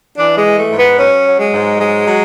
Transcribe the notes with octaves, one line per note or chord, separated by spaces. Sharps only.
E3 D4
G#3
E3
A3
G#2
B3
F#3 C#4
F#3
G#3
G#2
F#3 G#3
F#3